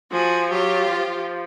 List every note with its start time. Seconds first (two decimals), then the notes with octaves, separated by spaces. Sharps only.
0.12 F3 F#4 G#4
0.51 F#3 F4 G4
0.89 F3